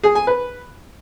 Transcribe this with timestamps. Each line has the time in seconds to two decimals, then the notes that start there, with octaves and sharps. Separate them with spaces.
0.03 G#4
0.15 G#5
0.27 B4